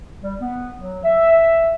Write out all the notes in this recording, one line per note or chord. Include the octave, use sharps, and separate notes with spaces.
G3
B3
F#3
E5